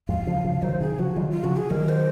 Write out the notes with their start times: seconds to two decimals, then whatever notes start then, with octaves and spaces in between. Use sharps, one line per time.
0.09 F2 G#2 F5
0.27 C#3 F3
0.45 C#3 F3
0.62 D#3 F#3 C5
0.80 C3 D#3 G#4
0.98 C#3 F3 F#4
1.16 D#3 F#3 F4
1.30 F4
1.43 C#3 F3 F#4
1.56 G#4
1.70 D#3 F#3 A#4
1.89 C5